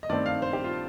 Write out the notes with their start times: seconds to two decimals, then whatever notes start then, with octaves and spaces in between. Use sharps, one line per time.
0.03 D#5
0.09 G2 D#3 A3 C4 D5
0.26 F5
0.42 C5
0.53 G4
0.64 F4